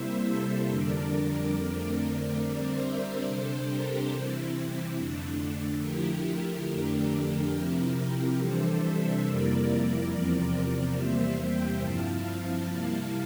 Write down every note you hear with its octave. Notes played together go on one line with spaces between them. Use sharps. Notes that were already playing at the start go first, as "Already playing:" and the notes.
Already playing: C3 G3 A#3 E4 C5 E5
A4 C5
F2 D3 G3 D4 A#4 D5
F2 D3 A3 C4
D3 G3 C4 A#4 D5
C5 E5
A#4 D5
C3 G3 D4 A4 C5
G4 A#4
C3 E3 G3 C4 E4
F2 D3 A3 D4
D3 F3 A3 E4 G4 A#4
F2 D3 A3 D4
C3 F3 C4 E4 G4 A#4
C3 E3 G3 D4 A4 C5
C5 E5
F2 C3 G3 A#3 E4 A#4 D5
A#4 D5
E2 C3 F3 C4 A#4 D5
E2 C3 G3 A#3 C5 E5
E5 G5
G2 F3 C4 E4 F5 A5
C3 G3 A#3 E4